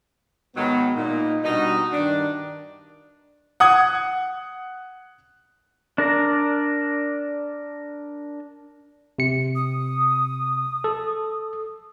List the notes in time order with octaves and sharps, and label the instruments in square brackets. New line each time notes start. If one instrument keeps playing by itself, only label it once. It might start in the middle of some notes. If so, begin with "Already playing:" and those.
[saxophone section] G#2 D#3 F#3 [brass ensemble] B3
[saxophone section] A#2 [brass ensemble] D#4
[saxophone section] B2 D#4 [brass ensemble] G3 D4 F#4
[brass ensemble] G2 D#3 [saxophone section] D4
[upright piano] F#5 D#6 F#6 G#6
[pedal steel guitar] D4 A#4 D5 A#5
[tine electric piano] C3 C#7
[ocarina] D#6
[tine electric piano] A4